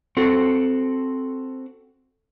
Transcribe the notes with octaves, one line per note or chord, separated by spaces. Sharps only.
C4 F#4 A4